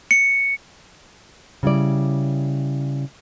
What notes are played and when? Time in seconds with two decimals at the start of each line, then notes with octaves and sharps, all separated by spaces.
0.11 C#7
1.63 C#3 G3 E4 D5